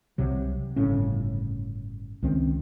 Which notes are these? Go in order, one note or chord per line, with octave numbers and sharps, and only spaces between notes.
C2 C3 F#3
G1 A2 C#3 C#4
C#2 D#3 C4